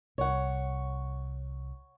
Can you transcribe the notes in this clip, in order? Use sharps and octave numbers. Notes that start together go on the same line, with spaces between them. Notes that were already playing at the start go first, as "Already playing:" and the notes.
C2 C#5 F#5